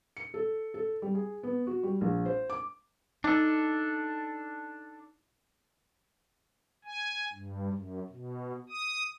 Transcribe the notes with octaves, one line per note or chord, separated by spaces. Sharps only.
C#7
A4
A4
G3
G#4
B3
F#4
G3
A#1
C5
D6
D4 D#4 A4
G#5
G2
F#2
B2
D#6